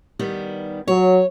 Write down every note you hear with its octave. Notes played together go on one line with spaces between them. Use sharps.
D#3 G3 B3
F#3 C#5